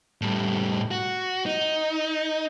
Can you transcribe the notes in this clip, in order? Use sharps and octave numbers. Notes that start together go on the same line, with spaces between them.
A2 G3
F#4
D#4